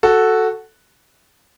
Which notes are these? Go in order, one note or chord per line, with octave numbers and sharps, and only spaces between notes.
F#4 A4